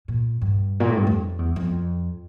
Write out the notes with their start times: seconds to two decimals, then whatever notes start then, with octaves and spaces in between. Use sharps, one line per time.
0.08 A#2
0.41 G2
0.80 A#2
0.89 A2
0.97 G2
1.07 F2
1.39 E2
1.56 F2